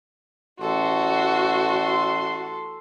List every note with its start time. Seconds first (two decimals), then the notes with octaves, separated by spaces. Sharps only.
0.61 A1 F#4 A4 C6